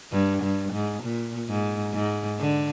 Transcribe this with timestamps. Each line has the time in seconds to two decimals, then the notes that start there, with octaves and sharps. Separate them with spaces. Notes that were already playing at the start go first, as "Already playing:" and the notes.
0.12 G2
0.43 G2
0.73 G#2
1.03 A#2
1.49 G#2
1.94 G#2
2.40 D3